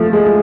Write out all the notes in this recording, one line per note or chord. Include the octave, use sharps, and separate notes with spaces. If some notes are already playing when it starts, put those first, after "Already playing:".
Already playing: F3 A3
G#3